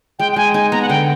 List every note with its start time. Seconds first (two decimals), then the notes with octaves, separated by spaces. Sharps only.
0.19 G#3 G5
0.32 G5
0.36 G#3 G#5
0.54 D#4 G#5
0.72 B3 A#5
0.82 F#5
0.89 D3 G5